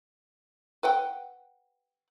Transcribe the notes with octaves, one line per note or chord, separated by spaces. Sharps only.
B4 F#5 G5